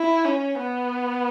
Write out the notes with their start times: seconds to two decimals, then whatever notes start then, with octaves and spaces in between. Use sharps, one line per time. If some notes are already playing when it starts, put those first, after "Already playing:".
Already playing: E4
0.25 C#4
0.60 B3